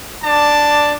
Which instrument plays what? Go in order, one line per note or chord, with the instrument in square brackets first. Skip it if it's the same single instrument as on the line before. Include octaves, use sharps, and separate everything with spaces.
[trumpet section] D4 D5 A5